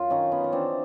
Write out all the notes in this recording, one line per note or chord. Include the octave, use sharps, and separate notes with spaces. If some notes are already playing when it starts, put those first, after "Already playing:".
Already playing: F#2 F4
D#3 C#4 D#4
B3 C#4
D#4
E3 C4 D4